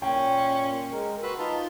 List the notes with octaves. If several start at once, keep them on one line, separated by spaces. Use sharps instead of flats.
A#2 C#4 G5 C6 C#6
G#3 A#4
F#4 B4 C6 E6
D#4 F4 A5